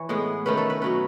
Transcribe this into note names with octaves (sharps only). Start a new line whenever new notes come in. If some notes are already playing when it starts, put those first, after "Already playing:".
Already playing: E3 C#5
A2 G#3 B3
D#3 A3 C#4 B4
A4
B4
B2 F#3 C#4 B4